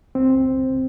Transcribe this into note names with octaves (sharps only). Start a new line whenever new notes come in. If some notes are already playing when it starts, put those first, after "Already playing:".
C#2 C4